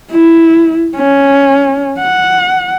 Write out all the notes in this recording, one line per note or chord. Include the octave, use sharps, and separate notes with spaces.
E4
C#4
F#5